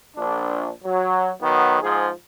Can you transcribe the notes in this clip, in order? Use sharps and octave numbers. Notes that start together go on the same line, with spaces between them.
A#1 D4
F#3
D#3 F#3 B3
G#2 F3 G#4